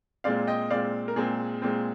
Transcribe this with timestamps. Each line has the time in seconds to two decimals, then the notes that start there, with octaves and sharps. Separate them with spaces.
0.24 A#2 G#3 C4 D5 F5
0.47 D#5 G5
0.70 A#2 G#3 C4 D5 F5
1.08 A#4
1.16 A#2 G#3 C4 G#4
1.62 A#2 G#3 C4